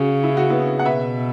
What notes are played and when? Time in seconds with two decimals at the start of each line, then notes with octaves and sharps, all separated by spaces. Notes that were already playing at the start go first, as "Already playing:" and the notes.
Already playing: C#3 C#4 F#4
0.24 E4
0.37 F#4
0.50 B3 E4
0.79 F#5
0.85 B2 B4 E5